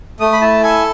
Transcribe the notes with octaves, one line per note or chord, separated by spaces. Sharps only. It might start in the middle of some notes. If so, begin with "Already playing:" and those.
A3 D#6
B5
E4 A5
A4 G#5